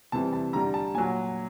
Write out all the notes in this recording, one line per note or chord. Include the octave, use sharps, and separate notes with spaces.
C3 E3 G3 A5
A5
D3 G3 A#5
A5
A#2 F#3 G#5